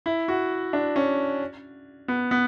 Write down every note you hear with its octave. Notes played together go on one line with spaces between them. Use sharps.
E4
F#4
D4
C#4
B3
B3